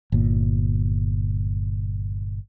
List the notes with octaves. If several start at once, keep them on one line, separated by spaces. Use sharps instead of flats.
G1 A#2